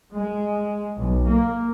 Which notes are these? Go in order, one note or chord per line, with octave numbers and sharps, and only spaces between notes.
G#3
B1
A#3